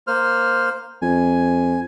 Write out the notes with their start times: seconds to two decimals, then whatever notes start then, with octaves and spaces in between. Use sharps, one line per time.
0.07 A#3 C5 F6
1.02 F2 G#5